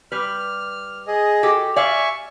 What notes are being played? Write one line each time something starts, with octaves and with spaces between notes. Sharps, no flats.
G3 B4 F6
G#4 D#5
F#4 G4 A4
D5 E5 F5 G#5 C#6